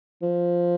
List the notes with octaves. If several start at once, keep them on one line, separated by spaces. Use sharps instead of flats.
F3